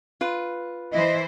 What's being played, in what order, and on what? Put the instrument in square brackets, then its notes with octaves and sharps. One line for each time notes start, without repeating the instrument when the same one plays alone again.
[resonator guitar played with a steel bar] F4 B4
[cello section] E3 E4 C5 [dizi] D#5